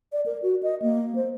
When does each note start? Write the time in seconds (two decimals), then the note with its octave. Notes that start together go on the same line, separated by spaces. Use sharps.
0.13 D5
0.26 A#4
0.42 F#4
0.63 D#5
0.82 A#3
1.15 C5